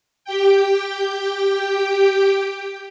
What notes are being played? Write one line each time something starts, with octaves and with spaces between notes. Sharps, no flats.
G4 G5